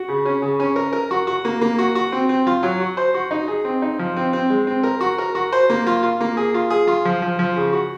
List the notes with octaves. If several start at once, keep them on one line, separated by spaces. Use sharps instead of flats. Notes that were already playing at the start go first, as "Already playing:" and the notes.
Already playing: F#4
C#3
C#4
C#3
C#4
A#4
A#4
F#4
F#4
A#3
A#3
F#4
F#4
C4
C4
F4
F#3
F#4
C5
F#4
D#4
G#4
C4
D#4
F3
C4
C4
G#3
C4
A#4
F#4
A#4
F#4
C5
A#3
F4
F4
A#3
G#4
F4
G#4
F4
F3
F3
F3
C#3
F#4